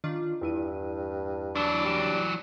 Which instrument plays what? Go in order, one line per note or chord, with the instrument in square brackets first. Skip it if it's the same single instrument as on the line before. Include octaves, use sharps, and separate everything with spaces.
[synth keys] D#3 D4 F4
[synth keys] E2 E4 D#7 [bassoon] G2
[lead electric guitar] E3 F#3 [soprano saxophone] D4
[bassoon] G3